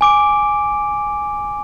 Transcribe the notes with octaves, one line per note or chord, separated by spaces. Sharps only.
G#5 D6 D7